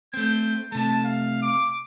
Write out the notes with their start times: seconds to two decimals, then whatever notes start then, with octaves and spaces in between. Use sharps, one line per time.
0.14 A3 C4 G6
0.72 C3 A3 A5
1.05 F5
1.42 D6